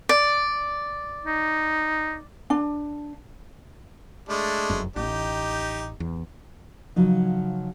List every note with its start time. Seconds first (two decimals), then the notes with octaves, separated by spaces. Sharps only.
0.09 D5
1.25 D#4
2.50 D4
4.29 G#3 A3 D4
4.70 F1 F#2
4.96 A1 D#4 G4
6.00 E2
6.96 C#3 F3 F#3 D#4